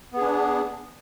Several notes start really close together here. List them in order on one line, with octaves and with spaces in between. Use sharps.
B3 G#4 D4